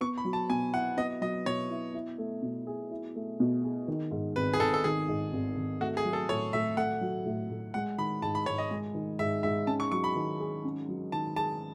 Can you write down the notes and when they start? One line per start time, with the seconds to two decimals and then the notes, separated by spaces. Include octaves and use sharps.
0.01 B3 C#6
0.18 B5
0.25 F#3
0.33 A5
0.50 B2 G#5
0.73 E4 F#5
0.97 B3 D#5
1.21 F#3 D#5
1.46 B2 C#5
1.71 E4
1.94 E4
2.18 A3
2.42 B2
2.67 G#4
2.91 E4
3.16 A3
3.40 B2
3.63 G#4
3.88 D#3
4.11 G#2
4.36 G#1 B4
4.53 G#4
4.60 G#1 A4
4.74 A4
4.84 D#3 G#4
5.08 G#2
5.33 G#1
5.57 G#1
5.80 A3 F#4
5.97 G#4
6.05 F#3
6.13 A4
6.29 A2 C#5
6.53 A2 E5
6.77 A3 F#5
7.01 F#3
7.25 A2
7.50 A2
7.74 G#3 F#5
7.98 D#3 B5
8.22 G#2 A5
8.35 B5
8.46 G#2 C#5
8.58 D#5
8.71 G#3
8.94 D#3
9.19 G#2 E5
9.43 G#2 E5
9.67 C#4 A5
9.80 C#6
9.92 F#3 C#6
10.04 B5
10.16 D#3
10.40 G#4
10.65 C#4
10.88 F#3
11.12 D#3 A5
11.36 G#4 A5